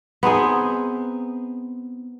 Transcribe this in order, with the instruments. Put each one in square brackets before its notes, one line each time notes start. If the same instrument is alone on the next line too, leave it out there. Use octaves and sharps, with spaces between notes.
[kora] B3 C4 D#4 G#4